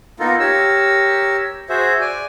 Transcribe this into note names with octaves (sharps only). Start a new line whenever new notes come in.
A#3 B3 D#4 F4 A4 A#4
G4 A#4 C#5 E6
F#4 G#4 C5 E5
D5 G#5